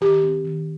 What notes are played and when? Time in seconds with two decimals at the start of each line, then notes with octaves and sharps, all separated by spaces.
0.01 D#3 G4
0.23 C4
0.44 D#3